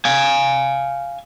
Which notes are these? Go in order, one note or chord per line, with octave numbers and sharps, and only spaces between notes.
F5 G#5